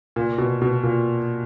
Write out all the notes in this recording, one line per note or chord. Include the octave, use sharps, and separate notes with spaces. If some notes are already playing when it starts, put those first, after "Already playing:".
A#2
B2
B2
A#2